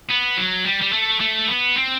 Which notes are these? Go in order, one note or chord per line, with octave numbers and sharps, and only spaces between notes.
B3
F#3
G3
G3
A3
A3
B3
C4